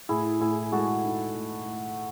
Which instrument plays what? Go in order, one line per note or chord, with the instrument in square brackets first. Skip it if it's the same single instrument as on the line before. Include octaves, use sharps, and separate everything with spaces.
[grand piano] A2 [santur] E4 G#4
[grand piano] A2 [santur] E4 G#4
[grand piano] G#3 [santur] F#4 A4
[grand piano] D#4
A2
A2